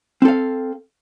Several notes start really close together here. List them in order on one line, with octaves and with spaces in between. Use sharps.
C4 A4 F5